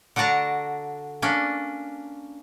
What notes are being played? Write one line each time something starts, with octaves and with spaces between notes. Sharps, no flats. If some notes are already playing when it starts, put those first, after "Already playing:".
D3 D4 F#4 A5 A#5
A#3 C#4 D4